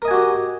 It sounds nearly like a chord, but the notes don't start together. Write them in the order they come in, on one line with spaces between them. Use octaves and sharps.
A#4 D#5 G#5 F#4 G4